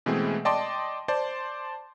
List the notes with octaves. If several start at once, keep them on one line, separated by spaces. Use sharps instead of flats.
B2 E3 G#3 A3 C4 G#4
D5 D#5 G5 A5 C6 D6
C5 D5 A5 C6